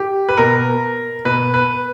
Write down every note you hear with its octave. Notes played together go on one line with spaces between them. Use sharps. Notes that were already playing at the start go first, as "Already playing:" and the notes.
Already playing: G4
B4
B2 A#4
B2 B4
B4